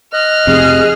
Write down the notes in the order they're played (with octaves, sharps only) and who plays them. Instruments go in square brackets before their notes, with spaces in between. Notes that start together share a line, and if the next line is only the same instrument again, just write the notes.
[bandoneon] D#5 F#6 [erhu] F6
[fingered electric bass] F2 C3 [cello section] G#4